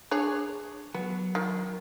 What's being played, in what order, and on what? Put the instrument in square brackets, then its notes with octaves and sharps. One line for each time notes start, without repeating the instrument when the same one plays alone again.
[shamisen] D4 G#4 C#5
[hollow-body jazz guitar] F#3 [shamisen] B3
[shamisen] D#3